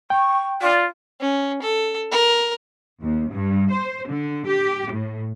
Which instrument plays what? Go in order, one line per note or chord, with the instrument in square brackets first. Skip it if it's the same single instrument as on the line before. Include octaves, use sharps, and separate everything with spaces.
[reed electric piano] G5 [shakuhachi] C#6
[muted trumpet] F4 [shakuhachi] D5
[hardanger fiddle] C#4
A4
A#4
[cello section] D#2
G2
C5
D3
G4
A2